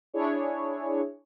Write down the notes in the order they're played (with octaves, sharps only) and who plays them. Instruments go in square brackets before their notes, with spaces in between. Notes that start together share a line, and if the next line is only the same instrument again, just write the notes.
[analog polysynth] D4 E4 G#4 C#5